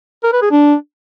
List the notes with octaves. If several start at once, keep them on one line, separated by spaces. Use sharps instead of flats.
A#4
B4
G#4
D4